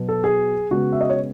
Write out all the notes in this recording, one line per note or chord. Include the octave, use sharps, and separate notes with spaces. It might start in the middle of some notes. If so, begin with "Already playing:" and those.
Already playing: B2 F#3 B3
A4
G#4
C#3 G#3 B3 F#4
E5
D#5
C#5